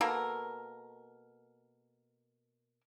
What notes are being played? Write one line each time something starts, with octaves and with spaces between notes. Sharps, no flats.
B2 A#3 A4 A#4